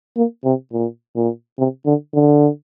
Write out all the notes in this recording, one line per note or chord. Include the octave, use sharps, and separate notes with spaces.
A#3
C3
A#2
A#2
C3
D3
D3